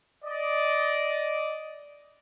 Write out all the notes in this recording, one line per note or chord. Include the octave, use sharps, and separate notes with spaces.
D5 D#5